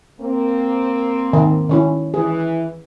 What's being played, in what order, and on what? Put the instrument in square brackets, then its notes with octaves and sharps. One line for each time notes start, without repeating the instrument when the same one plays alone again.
[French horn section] A#3 C4
[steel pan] D#3
D#3 C#4 E4
[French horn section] E3 [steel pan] G#4